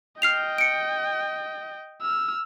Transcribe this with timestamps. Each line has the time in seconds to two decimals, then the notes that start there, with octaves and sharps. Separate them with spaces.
0.22 D#5 G5 F6 C7 F7
0.58 C#7 D7
2.01 E6 F6